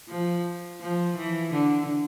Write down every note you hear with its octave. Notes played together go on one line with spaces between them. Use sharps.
F3
F3
E3
D3